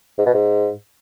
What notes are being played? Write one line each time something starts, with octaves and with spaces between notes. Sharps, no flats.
G#2
B2
G#2